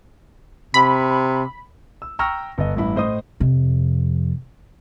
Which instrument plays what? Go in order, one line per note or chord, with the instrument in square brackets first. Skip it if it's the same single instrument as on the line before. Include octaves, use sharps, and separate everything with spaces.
[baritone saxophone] C3 [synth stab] B5
[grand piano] E6
G5 A#5 C#6 E6 F6 A#6
G1 D#5
A1 G2 E4 B5
A2 C5 D#5 D#6
[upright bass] F2 C3